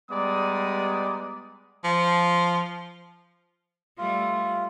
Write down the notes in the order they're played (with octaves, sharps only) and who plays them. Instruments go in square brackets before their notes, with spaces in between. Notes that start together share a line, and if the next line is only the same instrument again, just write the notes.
[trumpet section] G3 G#3 B3 D5 A#5 D#6
[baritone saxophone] F3
[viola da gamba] G3 A3 [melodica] F4